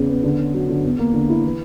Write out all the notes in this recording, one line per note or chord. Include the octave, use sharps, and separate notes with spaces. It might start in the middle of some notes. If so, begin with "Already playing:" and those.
Already playing: E2 C#3
B3
D3
C#4
F#3
D3
E2
A#3
D3
E4
E3